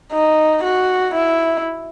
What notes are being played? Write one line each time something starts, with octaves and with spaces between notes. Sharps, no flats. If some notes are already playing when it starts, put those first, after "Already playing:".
D#4
F#4
E4